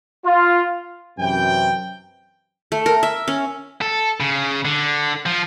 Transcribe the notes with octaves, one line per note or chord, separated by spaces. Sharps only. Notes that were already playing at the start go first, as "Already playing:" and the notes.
F4
F#2 C3 E3 G5
A3
A#4
E5
C#4
A4
C#3
D3
F3